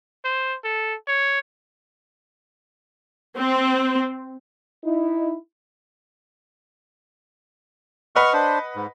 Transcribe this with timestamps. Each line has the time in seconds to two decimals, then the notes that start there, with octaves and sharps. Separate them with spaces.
0.25 C5
0.64 A4
1.07 C#5
3.37 C4
4.84 D#4 E4
8.16 B4 D#5 F#5 C#6 F6
8.33 D4 C5
8.76 G#2